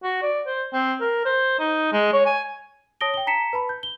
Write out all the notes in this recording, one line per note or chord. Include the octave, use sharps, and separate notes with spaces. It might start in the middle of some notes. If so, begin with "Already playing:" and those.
F#4
D5
C5
C4
A#4
C5
D#4
G#3
C#5
G#5
C#5 A5 D#6 A#6 D7 G7
G5 G7
A5 A#5 B6 C#7 E7
B4 A5 B5
G6
G7